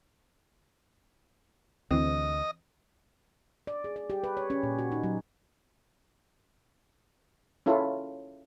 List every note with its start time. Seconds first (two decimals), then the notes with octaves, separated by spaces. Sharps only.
1.91 D2 E3 C4 D#5
3.67 D5
3.84 G#4
3.96 D5
4.10 G4
4.24 B4
4.37 C#5
4.50 C#4
4.63 A#2
4.79 F#4
4.92 D#4
5.03 F#3
7.66 C#4 E4 F4 A4